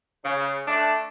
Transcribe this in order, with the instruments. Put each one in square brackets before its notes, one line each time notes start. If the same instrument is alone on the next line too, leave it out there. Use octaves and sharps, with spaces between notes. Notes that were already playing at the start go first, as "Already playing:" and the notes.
[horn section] C#3
A3 D4